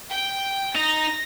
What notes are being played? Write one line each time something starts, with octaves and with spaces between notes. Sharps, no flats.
G5
D#4 A#6